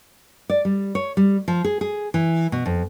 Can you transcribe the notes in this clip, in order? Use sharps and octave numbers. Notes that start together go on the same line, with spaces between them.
D5
G3
C#5
G3
F3
G#4
G#4
E3
B2
F2